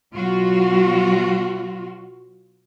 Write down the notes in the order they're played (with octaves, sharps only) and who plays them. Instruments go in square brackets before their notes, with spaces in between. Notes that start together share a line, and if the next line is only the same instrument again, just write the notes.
[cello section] B2 F#3 F4 F#4